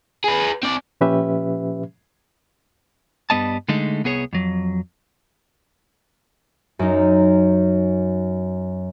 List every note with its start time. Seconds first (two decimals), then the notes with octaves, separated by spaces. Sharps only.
0.24 G#4 B4
0.63 C4 D5
1.01 A#2 F3 C#4 G4 B4 E5
3.30 G2 G3 B3 D#5 A5
3.68 D3 G#3 A3 D#4
4.04 C2 B3 G#4 C#5
4.33 F2 F#3
6.79 F#2 D#4